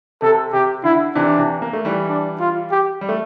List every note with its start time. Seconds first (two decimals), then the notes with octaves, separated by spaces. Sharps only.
0.22 C3 A4
0.53 C3 G4
0.84 D3 E4
1.15 C3 E3 D4
1.38 C3 E3
1.62 A#3
1.73 A3
1.85 E3 G3
2.09 D4
2.40 F4
2.71 G4
3.01 G3
3.09 A3